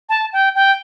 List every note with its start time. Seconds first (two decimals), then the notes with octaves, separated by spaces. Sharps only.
0.09 A5
0.33 G5
0.55 G5